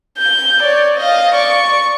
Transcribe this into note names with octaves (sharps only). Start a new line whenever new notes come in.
G6
C#5 D5
D#5 F5
D5 C#6